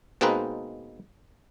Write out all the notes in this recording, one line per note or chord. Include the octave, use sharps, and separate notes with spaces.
B2 G#3 A#3 C4 D#4 B4